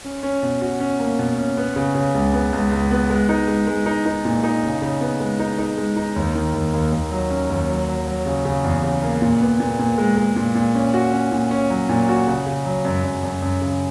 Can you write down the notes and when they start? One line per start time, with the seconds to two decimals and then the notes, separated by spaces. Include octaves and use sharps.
0.05 C#4
0.23 C#4
0.43 B2
0.61 F#4
0.80 C#4
1.00 A#3
1.19 B2
1.38 C#4
1.57 B3
1.76 C#3
1.95 C#3
2.14 C#2
2.34 B3
2.53 C#2
2.71 C#2
2.91 B3
3.10 G#3
3.29 D#4
3.48 G#3
3.67 G#3
3.86 D#4
4.06 D#4
4.25 A#2
4.44 D#4
4.63 C#3
4.82 C#3
5.01 B3
5.20 G#3
5.40 D#4
5.58 D#4
5.78 G#3
5.97 D#4
6.16 D#2
6.35 D#3
6.54 D#2
6.73 D#2
6.92 D#2
7.11 F#3
7.30 C#4
7.50 D#2
7.69 F#3
7.88 F#3
8.07 F#3
8.26 C#3
8.45 C#3
8.64 E2
8.83 C#3
9.03 A#3
9.22 A#2
9.41 B3
9.60 A#2
9.79 A#2
9.98 G#3
10.17 G#3
10.36 A#2
10.55 A#2
10.74 C#4
10.94 F#4
11.13 C#4
11.32 A#2
11.51 C#4
11.70 F#3
11.89 A#2
12.09 F#4
12.27 C#3
12.46 C#3
12.66 F#3
12.85 F#2
13.04 F#2
13.23 F#2
13.42 F#2
13.61 C#3